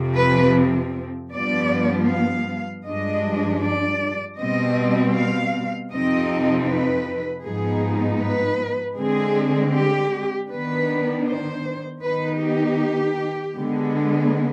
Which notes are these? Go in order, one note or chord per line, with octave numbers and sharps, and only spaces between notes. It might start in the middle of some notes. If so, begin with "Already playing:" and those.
Already playing: F2 C3 F3 C4
B4
G2 F3 B3 D5
F5
G2 F3 G#3 D4 D#5
D5
B2 G3 C4 D#5
F5
F2 C3 F3 C4 D#4 D#5
B4
G#2 F3 B3 D#4 G#4
B4
D3 G#3 C4 G#4
G4
D#3 B3 D4 B4
C5
D#3 B3 D#4 B4
G4
D3 G#3 B3